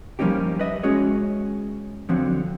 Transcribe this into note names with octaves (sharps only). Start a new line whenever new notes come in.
F3 G3 A#3 C#4 D#4 G4
B4 D#5 E5
G#3 C#4 F#4 G#4 C#5
D3 F3 F#3 C4